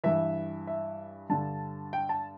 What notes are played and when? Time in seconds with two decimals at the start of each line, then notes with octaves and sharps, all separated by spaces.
0.04 G2 E3 E5
0.67 E5
1.30 G2 D3 A5
1.93 G5
2.09 A5